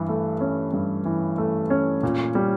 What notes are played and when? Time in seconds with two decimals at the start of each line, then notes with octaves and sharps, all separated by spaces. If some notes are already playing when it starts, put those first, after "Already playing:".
Already playing: G2 E3
0.09 A3
0.41 C#4
0.74 G2
1.05 E3
1.38 A3
1.70 C#4
2.03 A#2
2.35 G3